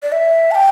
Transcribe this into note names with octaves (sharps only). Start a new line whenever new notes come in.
D5
E5
A5
G5